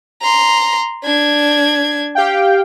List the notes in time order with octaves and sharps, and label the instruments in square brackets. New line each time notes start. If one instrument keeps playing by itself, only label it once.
[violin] A#5 C6
D4 G#6
[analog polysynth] G4 F5 G5